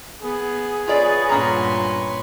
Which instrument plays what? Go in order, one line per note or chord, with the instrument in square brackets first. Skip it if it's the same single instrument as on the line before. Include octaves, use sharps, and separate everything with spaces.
[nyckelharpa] B3 [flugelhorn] G#4
[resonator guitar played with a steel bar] F4 D5 [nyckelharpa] B4 C#5
[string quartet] G2 A#2 C6 [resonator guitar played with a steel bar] B3 C#4 A#5